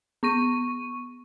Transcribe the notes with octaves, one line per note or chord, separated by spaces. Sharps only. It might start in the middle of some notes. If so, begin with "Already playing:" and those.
B3 C#6 D#7